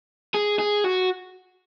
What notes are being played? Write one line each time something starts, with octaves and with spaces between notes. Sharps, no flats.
G#4
G#4
F#4